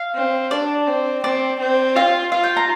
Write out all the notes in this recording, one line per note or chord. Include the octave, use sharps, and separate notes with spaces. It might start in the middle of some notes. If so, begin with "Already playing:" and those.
Already playing: F5
C4
D4 D5
C4
C4 D5
C4
F4 F5
F4 F5
G5
A#5